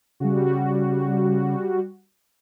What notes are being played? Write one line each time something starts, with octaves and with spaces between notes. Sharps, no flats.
C#3 G3 F#4